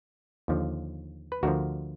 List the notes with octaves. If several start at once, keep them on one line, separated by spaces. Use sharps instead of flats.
D#2 D3 F3
B4
D2 D3 F3 F#4 A#4